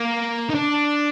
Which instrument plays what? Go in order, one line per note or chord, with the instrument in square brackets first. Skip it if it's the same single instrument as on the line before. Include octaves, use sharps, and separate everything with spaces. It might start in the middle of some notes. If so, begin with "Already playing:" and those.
Already playing: [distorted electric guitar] A#3
D#4
D4